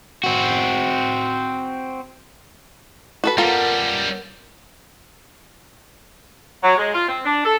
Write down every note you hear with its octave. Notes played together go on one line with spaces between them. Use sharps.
C4 F#4
F#4 A4 B4
F#2 G3 A#3 B3 F4 A4 A#4
F#3
G#3
F4
C4
D4
A4